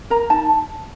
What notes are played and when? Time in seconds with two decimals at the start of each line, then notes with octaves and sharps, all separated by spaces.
0.10 A#4 A#5
0.30 D#4 A5